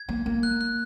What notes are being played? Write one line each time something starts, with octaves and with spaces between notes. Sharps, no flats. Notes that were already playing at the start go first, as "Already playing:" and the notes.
Already playing: G#6
A#3
A#3
F#6
F#6